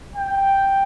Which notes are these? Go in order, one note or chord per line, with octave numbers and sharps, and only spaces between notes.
G5